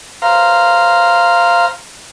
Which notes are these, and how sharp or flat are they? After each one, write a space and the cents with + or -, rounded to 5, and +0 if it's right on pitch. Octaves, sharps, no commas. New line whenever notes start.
C5 +0 F5 -10 A#5 +0